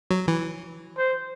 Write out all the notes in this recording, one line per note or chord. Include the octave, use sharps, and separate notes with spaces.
F#3
E3
C5